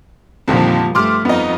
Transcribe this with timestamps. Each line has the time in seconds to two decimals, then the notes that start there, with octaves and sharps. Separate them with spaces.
0.48 F2 A#2 D3 D#3 F3 G3
0.95 G2 A3 C6 D6 F6
1.25 F2 B3 D#4 D#5